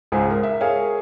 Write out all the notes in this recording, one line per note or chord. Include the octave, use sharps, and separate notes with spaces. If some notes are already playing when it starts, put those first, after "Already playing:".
C#2 G#2 G#4 C5 G#5
A#4
E5
G#4 A#4 C#5 F5